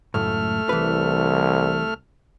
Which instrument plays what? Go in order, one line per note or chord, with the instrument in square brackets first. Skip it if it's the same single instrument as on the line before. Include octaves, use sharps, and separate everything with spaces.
[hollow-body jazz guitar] C#2 F#2 A2 [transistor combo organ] A3 F6
[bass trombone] C2 [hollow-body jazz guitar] E3 B4